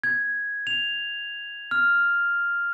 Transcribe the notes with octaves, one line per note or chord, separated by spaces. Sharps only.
G#6
F7
F6